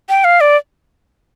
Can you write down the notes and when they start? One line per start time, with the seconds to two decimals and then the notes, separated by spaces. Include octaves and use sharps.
0.09 G5
0.24 F5
0.41 D5